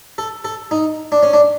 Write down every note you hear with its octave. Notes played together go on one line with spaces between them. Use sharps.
A4
A4
D#4
D4
C#4
D4